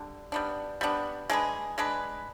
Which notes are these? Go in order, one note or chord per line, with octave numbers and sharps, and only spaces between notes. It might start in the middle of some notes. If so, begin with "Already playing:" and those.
Already playing: D3 G3 D4
G3 B3 D4
G3 B3 D4
G#3 D4 G#4 B4
G#3 D4 G#4 B4